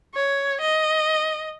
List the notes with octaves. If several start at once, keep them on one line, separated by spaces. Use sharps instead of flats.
C#5
D#5